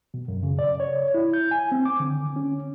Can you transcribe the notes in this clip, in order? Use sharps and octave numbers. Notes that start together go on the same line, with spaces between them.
B2
F#2
C#3
D5
C#5
E4
G6
G#5
C4
D6
D3
C#4